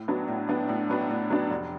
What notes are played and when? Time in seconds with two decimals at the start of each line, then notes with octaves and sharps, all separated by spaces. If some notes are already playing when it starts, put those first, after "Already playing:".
Already playing: A2
0.08 F#3 B3 D4
0.28 A2
0.49 F#3 B3 D4
0.69 A2
0.89 F#3 B3 D4
1.09 A2
1.30 F#3 B3 D4
1.50 F1